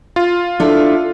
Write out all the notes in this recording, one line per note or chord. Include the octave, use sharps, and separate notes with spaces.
F4
D4 E4 A4